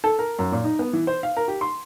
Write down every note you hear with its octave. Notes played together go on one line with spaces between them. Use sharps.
A4
A#4
F#2
A#2
D#4
B3
E3
C5
F5
A#4
G4
C6